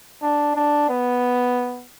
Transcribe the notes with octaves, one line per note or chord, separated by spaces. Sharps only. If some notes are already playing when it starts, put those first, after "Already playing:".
D4
D4
B3